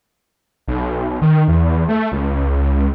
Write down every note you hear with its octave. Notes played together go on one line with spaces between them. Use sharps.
B1
D#3
E2
A3
C#2